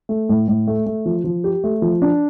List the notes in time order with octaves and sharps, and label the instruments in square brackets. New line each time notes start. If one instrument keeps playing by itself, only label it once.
[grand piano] A3
A2
A2
A3
A3
F3
F3
G4
A3
F3
D4